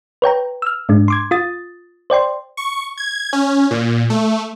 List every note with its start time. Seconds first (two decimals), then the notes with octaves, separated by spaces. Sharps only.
0.22 B4 C#5 G5 A#5
0.62 E6 F6
0.89 G#2 G#3 D4
1.08 C6 D6 G#6
1.31 F4 D#6 A6
2.10 C5 D5 G5 C6
2.57 C#6
2.98 G#6
3.33 C#4
3.71 A#2
4.10 A3